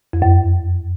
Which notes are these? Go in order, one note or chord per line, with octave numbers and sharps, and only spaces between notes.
F2
F#2